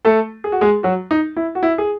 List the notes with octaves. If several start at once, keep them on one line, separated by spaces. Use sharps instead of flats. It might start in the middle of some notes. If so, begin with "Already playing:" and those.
A3 A4
G#4
F#4
G#3 G#4
F#3 F#4
D#4
E4
F#4
E4
G#4